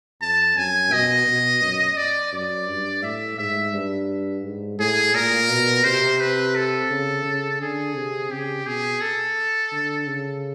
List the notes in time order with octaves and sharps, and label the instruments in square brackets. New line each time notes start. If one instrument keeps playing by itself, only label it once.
[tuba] F2 [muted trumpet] A5
[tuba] F#2 [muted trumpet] G#5
[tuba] B2 [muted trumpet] D#5
[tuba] B2
F#2
[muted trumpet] D5
[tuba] F#2 [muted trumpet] D5
[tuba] G2
[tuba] A2 [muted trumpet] E5
[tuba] G#2 [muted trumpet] E5
[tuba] G2
G#2
[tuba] A2 [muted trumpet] G#4
[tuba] A#2 [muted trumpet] A#4
[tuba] B2
[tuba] C3 [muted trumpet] C5
[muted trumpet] B4
A4
[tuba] C#3
C#3
[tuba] D3 [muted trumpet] G#4
[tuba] C3
[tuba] C#3 [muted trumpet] G4
[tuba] B2 [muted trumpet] G#4
[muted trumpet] A4
[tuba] D3
C#3